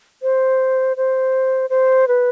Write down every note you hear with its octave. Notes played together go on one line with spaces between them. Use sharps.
C5
C5
C5
B4